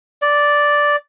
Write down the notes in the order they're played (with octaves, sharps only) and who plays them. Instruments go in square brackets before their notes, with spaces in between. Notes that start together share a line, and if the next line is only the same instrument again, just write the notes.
[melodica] D5